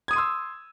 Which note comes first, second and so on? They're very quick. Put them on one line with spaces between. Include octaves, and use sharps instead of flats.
G#6 D#6 D#7 C6 E6